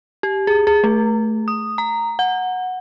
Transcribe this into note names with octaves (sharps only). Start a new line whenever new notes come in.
G4
G#4
G#4
A3
D#6
A#5
F#5